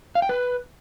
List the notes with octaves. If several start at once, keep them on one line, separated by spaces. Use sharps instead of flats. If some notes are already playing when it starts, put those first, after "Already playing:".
F5
G5
B4